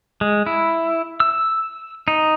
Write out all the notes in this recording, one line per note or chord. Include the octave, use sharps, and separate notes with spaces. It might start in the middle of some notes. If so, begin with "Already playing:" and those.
G#3
E4
E6
D#4